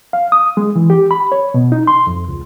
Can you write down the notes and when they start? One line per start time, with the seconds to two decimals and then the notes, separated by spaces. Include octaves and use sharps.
0.13 F5
0.32 D#6
0.57 G#3
0.76 E3
0.90 G4
1.11 B5
1.32 C#5
1.54 B2
1.72 D#4
1.87 C6
2.07 F2
2.29 C#2